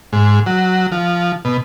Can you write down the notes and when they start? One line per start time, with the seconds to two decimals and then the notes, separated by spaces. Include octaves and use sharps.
0.13 G#2
0.46 F#3
0.92 F3
1.45 B2